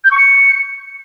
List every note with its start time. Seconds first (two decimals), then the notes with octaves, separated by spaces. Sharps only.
0.04 G6
0.10 C#6
0.17 C#7